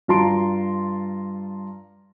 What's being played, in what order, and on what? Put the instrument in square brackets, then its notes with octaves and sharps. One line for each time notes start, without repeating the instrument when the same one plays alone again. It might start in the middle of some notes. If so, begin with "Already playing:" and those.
[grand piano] G2 F4 A5 A#5 C6 D7